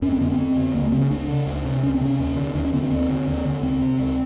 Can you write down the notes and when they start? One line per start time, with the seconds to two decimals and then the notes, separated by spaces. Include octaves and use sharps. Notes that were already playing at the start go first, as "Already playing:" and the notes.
0.02 F2 C#4
0.12 C4
0.20 D3 B3
0.31 C4
0.38 F2
0.56 D3
0.74 C#2 A#3
0.84 A3
0.92 C#3 C4
1.01 C#4
1.10 C#2 D4
1.28 C#3
1.46 C#2
1.65 C3
1.83 C#2 C#4
1.94 C4
2.01 C3 C#4
2.19 D#2
2.36 D3
2.55 D#2 D4
2.65 C#4
2.73 D3 B3
2.82 C4
2.91 D#2
3.09 D3
3.27 D#2
3.45 D3
3.63 C#2 C4
3.81 C3
3.99 C#2